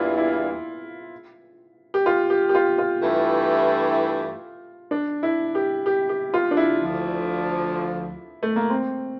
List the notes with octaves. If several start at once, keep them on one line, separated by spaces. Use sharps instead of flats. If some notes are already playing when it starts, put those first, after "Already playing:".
Already playing: E2 E3 G3 A#3 D4 E4 F4
E4
G4
F4
G4
G4
F4
F4
G2 E3 A3 E4 G4
D4
E4
G4
G4
G4
F4
D4
E4
D2 D3 F3
A3
A#3
C4